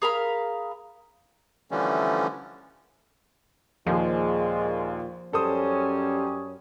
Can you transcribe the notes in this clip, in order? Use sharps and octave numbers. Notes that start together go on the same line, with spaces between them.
G#4 A#4 F5 B5
D3 E3 F3 G3 A3 C#4
D#2 A#2 F3 G#3 F4 G#4
F#2 G3 C#4 A4 C5 D#6